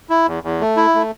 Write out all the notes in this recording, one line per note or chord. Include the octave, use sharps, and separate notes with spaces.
E4
E2
E2
A3
E4
A3